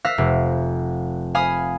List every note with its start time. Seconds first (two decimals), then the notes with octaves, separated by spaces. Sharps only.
0.05 F5 E6 F#6 A#6 B6
0.18 F1
1.35 F5 G#5 B5 D#6